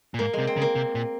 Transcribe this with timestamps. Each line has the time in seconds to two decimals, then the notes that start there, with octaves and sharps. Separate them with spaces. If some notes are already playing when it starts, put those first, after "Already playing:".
0.14 A#2
0.19 G#2 A#3
0.33 G#3
0.39 C3
0.47 C4
0.57 C#3
0.62 A#3
0.75 C3
0.95 A#2